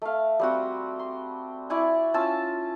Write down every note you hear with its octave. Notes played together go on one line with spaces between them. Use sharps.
A3 F5
G3 C4 F#4
C6
E4 D5 G#5 C#6
C#4 F4 A5 E6